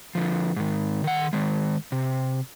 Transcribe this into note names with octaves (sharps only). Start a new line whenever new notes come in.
D3 F3
G#2 D#3
D#3 F#5
D#3 G#3
C3